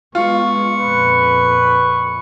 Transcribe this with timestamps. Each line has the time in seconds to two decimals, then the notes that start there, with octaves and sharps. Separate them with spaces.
0.15 G#3 B3 F4 C#6
0.79 F2 A#2 B4